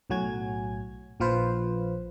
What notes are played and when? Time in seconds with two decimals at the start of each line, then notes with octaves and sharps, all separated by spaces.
0.10 B1 A2 F#3 F#4 G#5 G#6
1.20 A#1 F3 F4 B4 C5